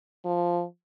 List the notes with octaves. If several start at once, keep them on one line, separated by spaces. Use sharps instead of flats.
F3